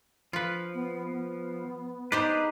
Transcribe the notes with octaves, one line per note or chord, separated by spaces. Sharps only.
F3 F4 B4
B3
B3
D#4 G4 G#4 B4 C5 D5